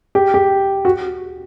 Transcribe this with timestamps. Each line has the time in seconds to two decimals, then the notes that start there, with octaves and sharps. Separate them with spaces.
0.15 G4
0.34 G4
0.85 F#4